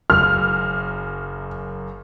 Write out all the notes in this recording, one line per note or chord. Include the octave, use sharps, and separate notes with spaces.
F#1 F#2 F6